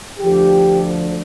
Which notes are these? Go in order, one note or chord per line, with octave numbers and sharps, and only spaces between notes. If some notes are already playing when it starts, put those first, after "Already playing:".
D2 D3 F3 G4